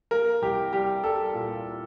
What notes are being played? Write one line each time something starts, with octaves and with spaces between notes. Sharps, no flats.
A#3 A#4
C2 G4
G3 G4
G3 A4
A#2